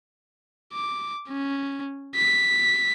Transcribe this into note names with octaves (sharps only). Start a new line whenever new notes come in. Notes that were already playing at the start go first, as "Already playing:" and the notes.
D6
C#4
B6